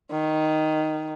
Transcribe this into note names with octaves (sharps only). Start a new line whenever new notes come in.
D#3